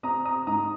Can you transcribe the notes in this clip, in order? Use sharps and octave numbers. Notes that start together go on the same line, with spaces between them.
C4 A#5 D#6
A#5 D#6
G#2 A#5 D#6